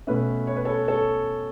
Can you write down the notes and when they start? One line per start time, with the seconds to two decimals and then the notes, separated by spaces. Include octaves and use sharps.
0.07 B2 A3 C#4 B4 E5
0.47 C#5
0.56 B4
0.65 A4 C#5
0.88 A4 C#5